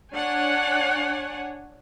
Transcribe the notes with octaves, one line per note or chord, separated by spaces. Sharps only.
D4 C#5 F#5 G#5